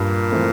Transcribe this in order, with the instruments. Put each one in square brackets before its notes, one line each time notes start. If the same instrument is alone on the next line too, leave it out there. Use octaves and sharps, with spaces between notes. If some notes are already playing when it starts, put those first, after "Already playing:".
Already playing: [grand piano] G2 [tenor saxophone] A#2
[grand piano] E3 A3 C4